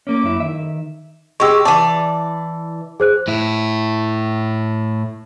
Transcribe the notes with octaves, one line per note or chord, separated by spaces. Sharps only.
A#3 C#4 D6
F#2 E4
D#3 E5
G#3 G4 C#6 E6
E3 D5 A5
G#4 C5 F#6
A2 E4